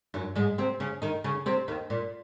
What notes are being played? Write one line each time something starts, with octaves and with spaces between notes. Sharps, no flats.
F#2 F#3
G#2 G#3
C3 C4
C#3 C#4
D#3 D#4
C#3 C#4
C3 C4
D#2 D#3
A#2